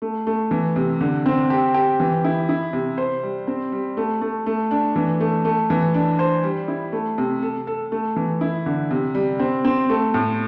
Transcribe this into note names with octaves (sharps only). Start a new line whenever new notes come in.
A3
A3
E3
C3
D3
C4
G4
G4
E3
E4
E4
C3
C5
G3
C4
G3
A3
A3
A3
D4
E3
A3
A3
E3
D4
C5
G3
E4
A3
C3
A4
A4
A3
E3
E4
D3
C3
G3
C4
C4
A3
A2